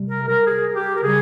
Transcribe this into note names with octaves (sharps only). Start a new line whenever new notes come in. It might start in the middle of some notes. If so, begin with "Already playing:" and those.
Already playing: C3 G3
A#4
A#4
G#4
G4
A#4
C#3 G3 G#4